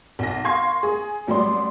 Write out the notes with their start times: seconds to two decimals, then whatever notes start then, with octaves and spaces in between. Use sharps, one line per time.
0.19 B1 A#6
0.44 F5 C6 C#6 G#6 C7
0.83 G#4
1.27 A1 F#3 G3 D5 C6